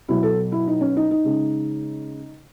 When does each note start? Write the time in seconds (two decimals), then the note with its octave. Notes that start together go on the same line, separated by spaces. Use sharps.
0.09 B2 F#3 E4
0.23 A4
0.52 E4
0.68 D#4
0.81 C#4
0.97 D#4
1.11 D#4
1.24 C#3 G#3